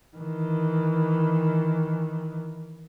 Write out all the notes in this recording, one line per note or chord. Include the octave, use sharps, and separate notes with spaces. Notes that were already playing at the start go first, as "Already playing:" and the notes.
D#3 E3